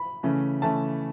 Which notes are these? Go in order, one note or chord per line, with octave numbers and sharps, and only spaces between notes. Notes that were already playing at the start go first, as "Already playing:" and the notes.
Already playing: B5
C#3 E3 A3 C#4
C#3 E3 A3 C#4 A5